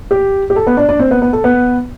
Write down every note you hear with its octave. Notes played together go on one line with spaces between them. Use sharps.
G4
G4
A4
B3 B4
D4 D5
D4 D5
C4 C5
B3 B4
B3 B4
A4
B3 B4